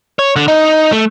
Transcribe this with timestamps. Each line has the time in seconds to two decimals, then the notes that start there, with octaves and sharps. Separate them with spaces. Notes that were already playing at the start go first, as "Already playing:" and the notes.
0.19 C#5
0.36 D3
0.48 D#4
0.92 A3